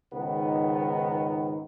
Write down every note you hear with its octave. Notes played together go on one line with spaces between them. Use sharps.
C#2 G#2 D#3 B3